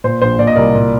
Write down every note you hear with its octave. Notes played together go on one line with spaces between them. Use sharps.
A#2 C5
A#1 C5
A#2 D5
D#5
C2 A#4 D5
A#2